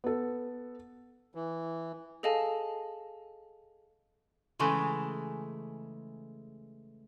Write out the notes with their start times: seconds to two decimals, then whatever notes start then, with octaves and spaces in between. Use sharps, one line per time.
0.04 B3 A4
1.35 E3
2.23 G#4 A4 D#5 F5 G#5 A5
4.59 C#3 E3 G#3 A3